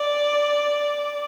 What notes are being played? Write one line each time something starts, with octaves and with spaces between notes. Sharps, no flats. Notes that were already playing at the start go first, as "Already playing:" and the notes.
Already playing: D5